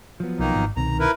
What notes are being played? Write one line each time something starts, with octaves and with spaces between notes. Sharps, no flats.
F3 F#3 B3
B1 D#3 A#3 D#4
G#1
C2 B2 D#3 C4 A#5
E4 A#4 B4